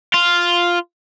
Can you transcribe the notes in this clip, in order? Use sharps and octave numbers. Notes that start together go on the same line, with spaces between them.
F4